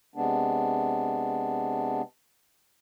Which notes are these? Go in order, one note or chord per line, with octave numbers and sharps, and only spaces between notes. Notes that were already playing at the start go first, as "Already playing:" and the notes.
C3 G#3 B3 D4